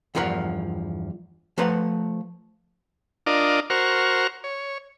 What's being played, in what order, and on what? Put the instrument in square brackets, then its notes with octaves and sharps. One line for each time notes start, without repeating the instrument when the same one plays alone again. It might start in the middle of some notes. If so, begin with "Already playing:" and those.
[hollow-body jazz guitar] E2 G2 F3 A#4 F#5
F3 A3 B4 C5 F#5 A#5
[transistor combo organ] D4 F4 A#4 D5 D#5
F#4 A#4 C5 C#6 F6
C#5